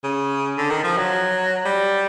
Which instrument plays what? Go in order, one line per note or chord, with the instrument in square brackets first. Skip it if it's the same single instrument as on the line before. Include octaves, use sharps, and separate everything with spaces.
[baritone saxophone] C#3
D3
D#3
F3
F#3
G3